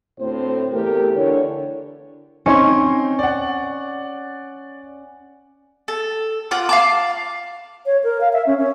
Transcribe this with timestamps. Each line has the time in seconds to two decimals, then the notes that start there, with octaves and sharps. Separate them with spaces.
0.20 D2 A2 A3 C4 C5
0.73 E2 A3 G4 A#4
1.15 D3 E3 C#5
2.46 C4 C#4 D#4 C6
3.19 D5 F#5
5.88 A4
6.51 F4 F#5 D6
6.69 F5 A5 D6
7.86 C#5
8.04 A#4
8.21 F5
8.33 E5
8.47 C#4
8.59 C#4